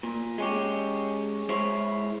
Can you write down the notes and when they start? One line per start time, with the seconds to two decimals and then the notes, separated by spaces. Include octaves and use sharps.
0.03 A#2
0.38 G#3 C#4 G4
1.49 G#3 E4 C5 C#5